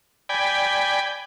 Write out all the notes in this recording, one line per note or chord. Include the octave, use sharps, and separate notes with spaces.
D5 G5 G#5 B5